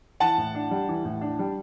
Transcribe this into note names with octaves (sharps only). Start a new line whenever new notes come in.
E3 F#5 A5
A2
D4
G3
E3
A2
D4
G3